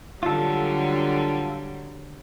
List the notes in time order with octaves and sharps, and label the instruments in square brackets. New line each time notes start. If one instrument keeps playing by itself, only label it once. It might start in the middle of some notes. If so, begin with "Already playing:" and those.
[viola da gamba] D3 F#3 G3 [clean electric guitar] F4 A4